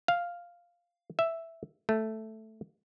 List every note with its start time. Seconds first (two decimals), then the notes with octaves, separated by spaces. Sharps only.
0.08 F5
1.19 E5
1.89 A3